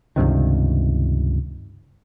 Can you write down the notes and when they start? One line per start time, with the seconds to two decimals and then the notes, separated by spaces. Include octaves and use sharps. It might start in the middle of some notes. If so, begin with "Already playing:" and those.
0.16 C#2 G2 C3 D#3